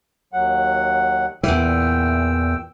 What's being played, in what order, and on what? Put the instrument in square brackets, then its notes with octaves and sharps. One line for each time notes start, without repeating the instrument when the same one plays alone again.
[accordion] D#2 F#3 F#5
[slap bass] E2 E3 [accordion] A#2 G5 E6